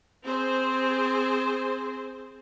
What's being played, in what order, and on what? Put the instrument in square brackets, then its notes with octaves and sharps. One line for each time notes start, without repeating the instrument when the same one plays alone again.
[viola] C4 G#4 [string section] C5